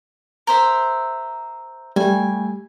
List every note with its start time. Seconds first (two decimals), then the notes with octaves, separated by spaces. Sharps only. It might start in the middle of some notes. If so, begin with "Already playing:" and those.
0.47 A#4 C5 E5
1.96 G3 A3 G#5